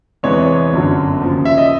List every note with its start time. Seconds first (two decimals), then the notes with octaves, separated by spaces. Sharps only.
0.23 E2 C3 E3 G#3 B3 C#5
0.73 G1 F#2 D3 F#3
1.21 D#2 C#3 F3
1.45 E5
1.58 D#5